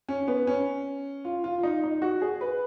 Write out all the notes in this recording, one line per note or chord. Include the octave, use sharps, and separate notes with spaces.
C#4
B3
C#4
F4
F4
F4
D#4
D#4
F#4
G#4
B4